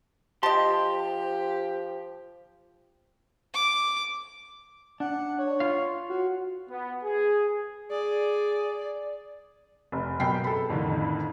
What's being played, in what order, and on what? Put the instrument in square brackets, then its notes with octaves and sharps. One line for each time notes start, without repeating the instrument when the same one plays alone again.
[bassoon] F3 [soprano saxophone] G4 [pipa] D#5 A5 [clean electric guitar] C6
[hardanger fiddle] D6
[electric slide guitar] D4 [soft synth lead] F#5
[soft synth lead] C#5
[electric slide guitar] F4 F5
[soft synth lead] F#4
[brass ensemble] B3
G#4
[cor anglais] G#4 [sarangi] D5
[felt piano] F1
F#2 B2 G5 B5 C7
A4 B5
F2 A2 D3 D#3